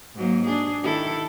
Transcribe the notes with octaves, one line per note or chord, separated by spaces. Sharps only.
G#2 F#3 A#3
D4 G#4
D#3 E4 A4